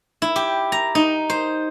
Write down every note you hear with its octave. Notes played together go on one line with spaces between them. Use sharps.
E4
G4
A#5
D#4
C5